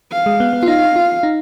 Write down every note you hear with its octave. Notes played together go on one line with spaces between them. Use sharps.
F5
G#3
B3
B3
F4
D#4 F5
F4
D#4